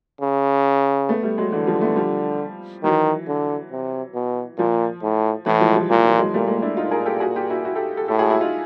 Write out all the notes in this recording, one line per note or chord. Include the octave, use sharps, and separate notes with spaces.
C#3
A3 B3
G3 A3
F#3 G#3
D3 E3 F#3
F3 G3
A3 B3
F3 G3
D#3 E3 F#3
D3
C3
B2
A#2 F3
A2
A2 E3
F3
G#3
F3 G3
A#2 F3
E3 F#3
F#3 G#3
A#2 G3 A3
G#3 A#3
D4 E4
A#2 D#4 F4
G#4 A#4
G4 A4
F#4 G#4
F4 G4
E4 F#4
E4 F#4
G4 A4
G4 A4
A2 G4 A4
F#4 G#4
E4 F#4
D#4 F4